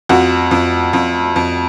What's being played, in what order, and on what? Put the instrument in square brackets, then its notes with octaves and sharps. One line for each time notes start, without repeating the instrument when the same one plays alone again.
[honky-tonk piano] F2 F#4
F2
F2
F2